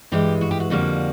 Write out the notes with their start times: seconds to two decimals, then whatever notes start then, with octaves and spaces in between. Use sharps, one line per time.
0.12 G2 E3 G#3 G4
0.41 F#4
0.51 G4
0.60 F#4
0.70 F2 D3 G3 A#3 F#4